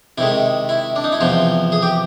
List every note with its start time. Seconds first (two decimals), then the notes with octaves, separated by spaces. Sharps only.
0.18 C3 D#3 G#3 E4
0.69 E4
0.96 D4
1.04 D#4
1.12 E4
1.20 E2 C3 F3 F4
1.72 G#4
1.82 G4